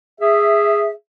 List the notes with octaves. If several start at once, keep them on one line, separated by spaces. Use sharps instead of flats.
G#4 E5